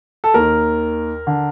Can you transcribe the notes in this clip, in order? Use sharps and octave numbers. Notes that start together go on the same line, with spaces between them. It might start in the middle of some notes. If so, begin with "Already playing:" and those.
A4
D#2 D#3 A#4
D3